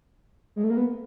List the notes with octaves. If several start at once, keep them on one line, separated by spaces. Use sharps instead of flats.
G#3
A3
A#3
B3